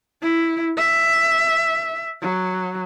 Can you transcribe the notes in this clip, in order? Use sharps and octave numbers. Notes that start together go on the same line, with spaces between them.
E4
E5
F#3